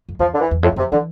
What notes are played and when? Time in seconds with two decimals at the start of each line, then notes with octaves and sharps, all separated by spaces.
0.09 F2
0.19 E2 F3
0.34 D3
0.41 E3
0.51 E2
0.63 F2 A2
0.72 G2
0.76 F2 C3
0.91 D3 E3